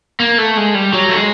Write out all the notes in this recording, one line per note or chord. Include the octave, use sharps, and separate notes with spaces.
A#3
A3
G#3
G3
F#3
A3
G#3